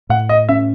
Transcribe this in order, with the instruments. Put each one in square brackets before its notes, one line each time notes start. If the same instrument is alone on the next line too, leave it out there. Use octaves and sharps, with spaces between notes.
[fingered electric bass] A2 [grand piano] F#5
[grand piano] D#5
[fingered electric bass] C#4 [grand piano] E5